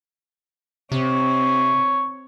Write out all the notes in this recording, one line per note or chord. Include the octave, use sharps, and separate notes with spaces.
C3 C4 C#5